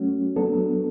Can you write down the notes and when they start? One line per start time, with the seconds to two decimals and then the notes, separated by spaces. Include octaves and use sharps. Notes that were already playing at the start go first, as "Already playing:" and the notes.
Already playing: F#3 A3 C#4 F#4
0.36 F#3 B3 D4 A4